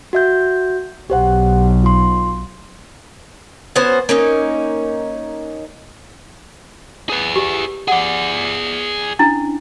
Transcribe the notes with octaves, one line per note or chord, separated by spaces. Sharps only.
F#4 E5 G6
B1 G4 C5 F#5
F4 C6
B3 C#4 F#4 C5
A#3 C#4 D#4
G#4 B4
G4
G#4 D5 F#5
C#4 D4 E4